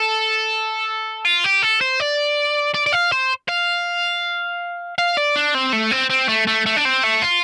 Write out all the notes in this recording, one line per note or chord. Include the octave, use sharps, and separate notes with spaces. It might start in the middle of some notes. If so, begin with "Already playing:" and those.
Already playing: A4
F4
G4
A4
C5
D5
D5
D5
F5
C5
F5
F5
D5
D4
C4
A3
C4
C4
A3
A3
A3
D4
C4
A3
F4